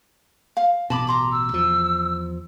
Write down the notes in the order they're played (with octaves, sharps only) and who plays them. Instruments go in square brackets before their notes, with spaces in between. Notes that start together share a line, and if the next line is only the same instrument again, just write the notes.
[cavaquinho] F5
[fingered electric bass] A1 B2 [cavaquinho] A5 B5 D6
[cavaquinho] A#5 C6 D6
[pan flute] E6
[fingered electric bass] E2 F3